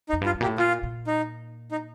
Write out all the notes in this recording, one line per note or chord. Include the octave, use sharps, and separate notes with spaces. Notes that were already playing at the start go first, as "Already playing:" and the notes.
D#4
F2
G2
F4
G2
A#2 G4
A2
A#2 F4
A#2
D#4
D#4